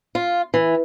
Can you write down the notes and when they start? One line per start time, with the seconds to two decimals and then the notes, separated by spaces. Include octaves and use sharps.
0.15 F4
0.54 E3